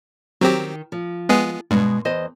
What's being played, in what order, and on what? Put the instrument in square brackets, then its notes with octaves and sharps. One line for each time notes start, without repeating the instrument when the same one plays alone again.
[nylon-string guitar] D#3 [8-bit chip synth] F#3 C4 G4
[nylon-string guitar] F3
[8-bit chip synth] G#3 B3 G#4
[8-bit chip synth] G2 [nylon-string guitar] B2 G#3
[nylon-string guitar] E2 C5 D#5